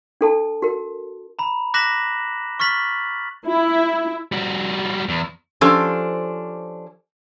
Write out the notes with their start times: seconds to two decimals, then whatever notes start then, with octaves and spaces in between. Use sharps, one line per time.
0.21 D4 A4 A5
0.62 F#4 A#4
1.39 A#5 B5
1.74 D6 F#6 A#6 B6 E7 F#7
2.60 C#6 F6 A6 B6 F#7
3.48 E4
4.32 G3 F#4
5.09 E2
5.61 F3 C#4 D4 G4 A4 C5